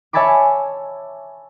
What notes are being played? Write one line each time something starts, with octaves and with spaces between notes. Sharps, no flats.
C#5 E5 G#5 A5 B5 D6